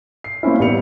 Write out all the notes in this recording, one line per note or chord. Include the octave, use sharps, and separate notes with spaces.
C7
A#3 C4 C#4 E4
A1 G3 B3 C#7 F7